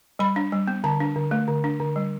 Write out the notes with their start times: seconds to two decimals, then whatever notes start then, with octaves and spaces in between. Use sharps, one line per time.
0.19 G3 B5
0.36 D4
0.52 G3
0.68 B3
0.84 D3 A5
1.00 D4
1.16 D3
1.31 A3
1.48 D3
1.64 D4
1.80 D3
1.96 G3